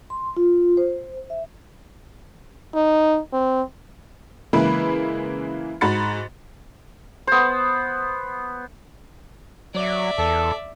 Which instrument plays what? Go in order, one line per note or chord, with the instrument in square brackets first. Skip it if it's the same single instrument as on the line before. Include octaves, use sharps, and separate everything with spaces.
[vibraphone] C6
F4
C5
E5
[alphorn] D#4
C4
[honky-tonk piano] C#3 E3 G#3 A#3 E4 B4
G#2 F#4 B5 A6 C#7
[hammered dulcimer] B3 C5
[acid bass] F#3 [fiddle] D5 E5
[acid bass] E2 [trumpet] A4